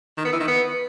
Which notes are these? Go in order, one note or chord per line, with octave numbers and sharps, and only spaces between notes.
D#3
B3
E3
D#3
B3